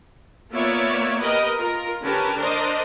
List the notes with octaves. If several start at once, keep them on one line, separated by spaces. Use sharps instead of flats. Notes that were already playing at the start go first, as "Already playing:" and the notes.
A#3 B3 F4 C#5 D5 E5
G4 A#4 B4 D#5
F4 A#4
D3 C#4 G4 A#4 B4 A5
D4 A#4 C5 D5 D#5